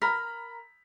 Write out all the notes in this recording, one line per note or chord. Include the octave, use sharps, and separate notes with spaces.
A#4 A#5 B5 B6